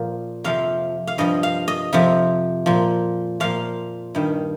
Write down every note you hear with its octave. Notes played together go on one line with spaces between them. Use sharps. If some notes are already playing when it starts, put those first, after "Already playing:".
Already playing: A#2 F3
F2 C3 F3 F5
F5
G2 F3 D#5
F5
D#5
F2 C3 F3
A#2 F3
A#2 F3 F5
G2 D#3